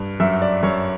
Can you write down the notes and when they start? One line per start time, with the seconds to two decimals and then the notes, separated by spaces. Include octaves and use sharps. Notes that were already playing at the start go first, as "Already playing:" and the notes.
Already playing: G2
0.20 F#2 E5
0.42 D5
0.63 F#2 C#5